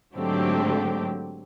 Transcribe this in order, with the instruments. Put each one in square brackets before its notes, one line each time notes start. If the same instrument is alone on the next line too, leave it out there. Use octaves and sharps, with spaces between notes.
[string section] G#2 D3 F#3 A3 C4 G4